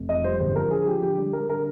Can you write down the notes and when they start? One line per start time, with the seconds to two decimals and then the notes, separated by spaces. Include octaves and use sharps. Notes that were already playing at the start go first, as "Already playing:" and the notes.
Already playing: F1
0.09 F2 D#5
0.24 G3 C5
0.40 G1 C5
0.55 F3 A#4
0.71 D3 G#4
0.87 F3 G4
1.02 D3 G4
1.18 G3
1.33 G3 A#4
1.49 D3 A#4